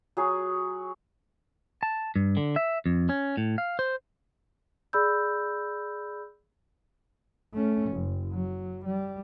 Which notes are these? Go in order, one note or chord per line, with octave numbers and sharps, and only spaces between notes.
F#3 G#4
A5
G2
D3
E5
F2
C#4
A2
F5
C5
G#4 D5 B5 E6 G6
A3 C#4
F#1
F#3
G3